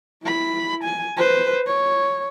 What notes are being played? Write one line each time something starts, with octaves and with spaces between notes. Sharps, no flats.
E4 B5
G#5
B4 C5
C#5